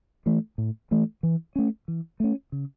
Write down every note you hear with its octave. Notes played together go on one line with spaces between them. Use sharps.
E3 A3
A2
E3 A3
E3
A3 C#4
E3
A3 C#4
C#3